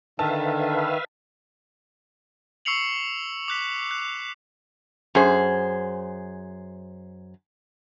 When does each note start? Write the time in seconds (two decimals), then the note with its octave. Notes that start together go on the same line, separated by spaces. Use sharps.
0.19 D3 D#3 B4 E5 F5 A5
2.65 C#6 E6 C7 C#7 F7 F#7
3.48 D6 F#6 B6
3.91 F#6
5.15 F#2 G#4 C5